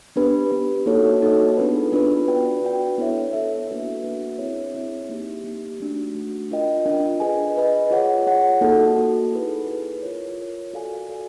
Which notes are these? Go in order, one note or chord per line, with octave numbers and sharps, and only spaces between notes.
B3 D4 G4 B4
B3 D4 G4 B4
A#3 D#4 F#4 A4 C#5
A#3 D#4 F#4 A4 C#5
B3 D4 F4 G#4 B4
B3 D4 F4 G#4 B4
D4 F#4 B4 D5 G5
D4 F#4 B4 D5 G5
B3 E4 A4 C#5 E5
B3 E4 A4 C#5 E5
A#3 D4 F#4 B4 E5
A#3 D4 F#4 B4 E5
C4 E4 G#4 C#5 E5
C4 E4 G#4 C#5 E5
A#3 D#4 G4
A#3 D#4 G4
A3 D4 F#4
A3 D4 F#4
D4 F4 A#4 D#5 G5
D4 F4 A#4 D#5 G5
G#4 B4 D#5 G#5
G#4 B4 D#5 G#5
F4 G#4 C#5 F#5
F4 G#4 C#5 F#5
A#3 D#4 F#4 A4
A#3 D#4 F#4 A4
E4 G#4 B4
E4 G#4 B4
F4 A#4 C#5
F4 A#4 C#5
F#4 A4 D5 F5 G#5
F#4 A4 D5 F5 G#5